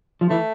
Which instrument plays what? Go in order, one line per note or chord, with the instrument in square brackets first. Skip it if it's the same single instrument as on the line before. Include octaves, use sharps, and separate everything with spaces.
[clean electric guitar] F3
[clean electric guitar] E3 [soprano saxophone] A3